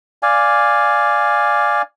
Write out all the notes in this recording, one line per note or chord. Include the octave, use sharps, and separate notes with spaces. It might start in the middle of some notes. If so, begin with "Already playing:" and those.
D5 F5 G#5